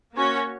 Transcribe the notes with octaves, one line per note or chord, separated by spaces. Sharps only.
A#3 C#4 F#4 C#5